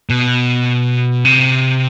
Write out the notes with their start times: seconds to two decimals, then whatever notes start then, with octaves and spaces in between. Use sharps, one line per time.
0.10 B2
1.25 C3